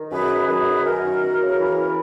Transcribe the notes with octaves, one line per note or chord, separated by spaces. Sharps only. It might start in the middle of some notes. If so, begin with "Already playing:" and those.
Already playing: D#3
F#2 G#4 B4
D#3
F#2 G#4 B4
D#3
F#2 F#4 A#4
D#3
E2
C#3
E3
E2